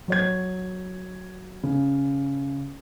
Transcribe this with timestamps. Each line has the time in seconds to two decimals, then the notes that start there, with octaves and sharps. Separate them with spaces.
0.08 F#3 C#5 G#6
1.63 C#3